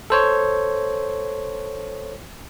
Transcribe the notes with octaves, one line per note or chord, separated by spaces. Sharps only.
A4 C5 C#5